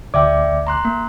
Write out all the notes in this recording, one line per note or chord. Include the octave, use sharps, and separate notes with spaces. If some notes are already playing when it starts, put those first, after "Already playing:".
D2 D5 E5 G5 D6
A#5 C6 F#6
A#3